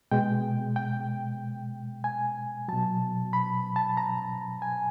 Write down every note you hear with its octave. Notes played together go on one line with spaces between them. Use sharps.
B2 G#3 G5
G5
G#5
B2 F#3 A5
B5
A5
A#5
G#5